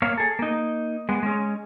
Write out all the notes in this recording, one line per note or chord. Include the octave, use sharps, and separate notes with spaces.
A#3 C#5 F5
G#4 A4
A#3 D#4
G#3 B3
G#3 C#4